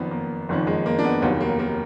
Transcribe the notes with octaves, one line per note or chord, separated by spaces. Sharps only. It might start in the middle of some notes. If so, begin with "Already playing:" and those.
Already playing: F#1 F2 D#3 B3
A#3
F#1 F2 D#3
G#3
A#3
D4
B3
F1 D#2 D#3 F#3 B3
A#3
A#3